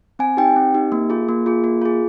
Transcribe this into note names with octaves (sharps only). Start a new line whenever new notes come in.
C4 G#5
D#4 G4 G5
C4
D#4 G4
A#3
F4 G#4
A#3
F4 G#4
A#3
F4 G#4